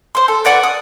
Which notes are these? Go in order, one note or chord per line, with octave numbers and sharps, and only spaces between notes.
C5 C6
A4
B4 D5 F#5 C#6
D#6